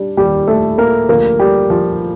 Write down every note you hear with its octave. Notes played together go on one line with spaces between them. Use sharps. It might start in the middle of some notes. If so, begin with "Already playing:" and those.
Already playing: G3 D4
D#2 D#3 G3 G4
A3 A4
A#3 A#4
D2 D3 F3 A#3 A#4
G3 G4
F3 F4